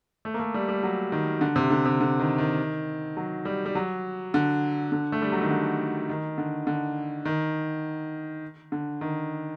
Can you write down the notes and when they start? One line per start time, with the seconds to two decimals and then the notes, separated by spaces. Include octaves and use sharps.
0.25 A3
0.34 A#3
0.39 A3
0.54 G3
0.69 G3
0.83 F#3
1.12 D#3
1.41 D3
1.56 C3
1.70 D3
1.85 C3
2.01 D3
2.19 D#3
2.38 D#3
3.17 F#3
3.45 G3
3.66 G3
3.75 F#3
4.34 D3
4.92 D3
5.12 A3
5.22 G3
5.32 F#3
5.41 D#3
5.50 D3
6.09 D#3
6.38 D3
6.67 D3
7.25 D#3
8.72 D3
9.01 D#3